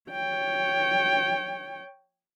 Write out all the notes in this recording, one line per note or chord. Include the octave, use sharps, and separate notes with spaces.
C#5 G5